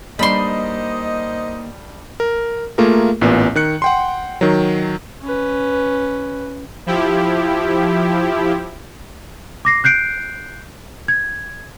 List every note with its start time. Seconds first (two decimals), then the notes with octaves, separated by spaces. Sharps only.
0.19 G3 A#3 D4 D#4 C5 D#5 B5 C6
2.20 A#4
2.78 A3 A#3 F4 G#4 A#4
3.21 A1 A#2 B3
3.55 D#3 F#6 C#7
3.82 F#5 G5 C6
4.41 D#3 F#3
5.22 C#4 B4
6.86 F3 E4 G4
9.65 D6 A#6 C7
9.84 F#6 G6 C7 D7
11.08 G#6